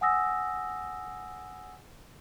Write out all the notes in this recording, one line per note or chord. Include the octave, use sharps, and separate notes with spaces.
F#5 G#5 D#6 E6 A#6